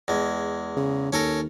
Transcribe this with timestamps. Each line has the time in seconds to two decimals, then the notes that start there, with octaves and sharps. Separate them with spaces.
0.08 E2 G#3
0.76 C#3
1.13 D#2 C#4 A4 A#4